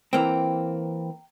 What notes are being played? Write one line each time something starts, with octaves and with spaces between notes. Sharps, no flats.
E3 A#3 C4 G5 A#5